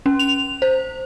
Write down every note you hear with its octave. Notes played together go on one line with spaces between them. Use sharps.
C#4
F7
C5